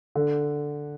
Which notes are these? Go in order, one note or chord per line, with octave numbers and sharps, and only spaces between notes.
D3